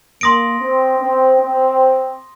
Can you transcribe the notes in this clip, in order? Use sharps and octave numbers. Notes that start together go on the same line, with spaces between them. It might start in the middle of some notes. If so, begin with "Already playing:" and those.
A#3 C6 D#6 A#6 D7
C4
C4
C4